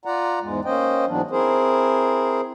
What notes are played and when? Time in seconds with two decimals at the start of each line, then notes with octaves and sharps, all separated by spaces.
0.05 F4 D5 F#5 A#5
0.42 E2 G#2 G#3
0.65 A#3 C#4 C5 D#5 G5
1.08 G#2 E3 F#3 B3 D4
1.31 C4 E4 G#4 A#4 C5